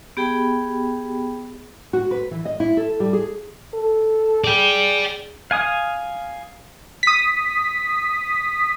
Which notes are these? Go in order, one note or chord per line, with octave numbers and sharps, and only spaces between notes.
B3 G4 G#4 G5 B5
F#4
B4
E3
D#5
E4
A4
G3
G#4
A4
G#4 D5 G5
F5 G#5 D#6
D#6 B6